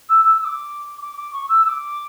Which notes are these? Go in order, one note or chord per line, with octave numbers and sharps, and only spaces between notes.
E6
E6
E6
D6
D6
D6
C#6
E6
E6
D6